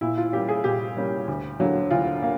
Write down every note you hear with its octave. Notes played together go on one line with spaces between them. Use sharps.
A#2 E4
F4
G3 A#3 C#4 G4
G#4
A#2 G4
G3 A#3 C#4
D2
D3 F#3 A#3
D2 F4
A#3